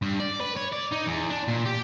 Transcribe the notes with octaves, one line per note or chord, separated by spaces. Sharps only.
G2
D5
B4
C#5
D5
D#4
E2
D4
A#2
G4